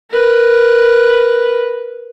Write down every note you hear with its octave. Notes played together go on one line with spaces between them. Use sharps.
A#4 B4